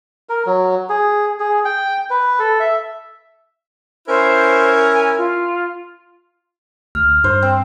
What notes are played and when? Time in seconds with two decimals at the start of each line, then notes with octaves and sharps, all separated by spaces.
0.29 A#4
0.46 F#3
0.89 G#4
1.40 G#4
1.65 G5
2.10 B4
2.39 A4
2.60 E5
4.08 C#4 E4 A#4 C5
4.92 G#5
5.17 F4
6.95 D2 F6
7.24 G2 C5
7.42 C4